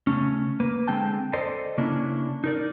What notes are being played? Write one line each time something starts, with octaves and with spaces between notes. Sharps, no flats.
C#3 A3 C#4
A#3 B4
D3 G#3 C4 G5 A5
A4 C5 D5 D#5
C#3 A#3 C#4 D4 E4
D#4 A#4 D5